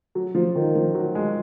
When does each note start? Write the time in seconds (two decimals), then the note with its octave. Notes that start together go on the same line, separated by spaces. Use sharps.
0.15 F#3
0.35 F3
0.55 D#3
0.75 F3
0.95 F#3
1.15 G#3